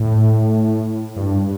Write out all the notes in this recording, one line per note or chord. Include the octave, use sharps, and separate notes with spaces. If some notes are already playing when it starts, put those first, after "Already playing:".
Already playing: A2
G2